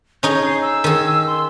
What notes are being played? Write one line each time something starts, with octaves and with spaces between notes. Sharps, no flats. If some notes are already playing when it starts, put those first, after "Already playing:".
C#4 D#4 G#4 G6
C7
E6
D#3 G#4
C6